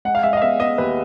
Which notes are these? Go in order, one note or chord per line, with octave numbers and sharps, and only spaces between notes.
G#3 F#5
F5
G#3 E5
D#5
F5
B3 E5
B3 D#5
D#2 B4